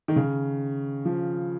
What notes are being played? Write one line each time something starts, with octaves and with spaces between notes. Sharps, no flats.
D#3
C#3
F3